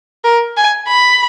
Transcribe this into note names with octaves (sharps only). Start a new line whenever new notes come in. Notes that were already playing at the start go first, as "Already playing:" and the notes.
A#4
G#5
B5